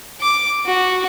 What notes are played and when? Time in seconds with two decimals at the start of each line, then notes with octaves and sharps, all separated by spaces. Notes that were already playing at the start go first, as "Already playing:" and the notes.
0.21 D6
0.66 F#4